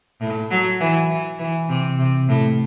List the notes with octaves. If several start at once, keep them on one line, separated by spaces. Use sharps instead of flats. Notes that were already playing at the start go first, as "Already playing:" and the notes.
A2
F#3
E3
E3
E3
C3
C3
A2